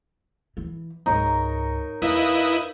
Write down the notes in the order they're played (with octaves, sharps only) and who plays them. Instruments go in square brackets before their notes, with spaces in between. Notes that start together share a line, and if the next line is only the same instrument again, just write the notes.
[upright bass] E3
[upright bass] C#2 G#2 [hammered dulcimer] D#4 A#4 C#5
[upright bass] E2 E3 [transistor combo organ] E4 B4 D#5 [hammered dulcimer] F5